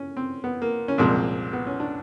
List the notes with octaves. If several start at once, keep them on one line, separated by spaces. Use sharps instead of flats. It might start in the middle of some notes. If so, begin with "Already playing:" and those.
Already playing: C#4
C4
B3
A#3
C#4
C2 A#2 F3 G#3 C4
B3
C#4
D4